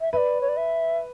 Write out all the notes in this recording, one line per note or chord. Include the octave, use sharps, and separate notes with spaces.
E5
B4 D5 E5
C#5
D5
E5